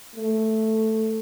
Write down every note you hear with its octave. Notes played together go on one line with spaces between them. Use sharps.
A3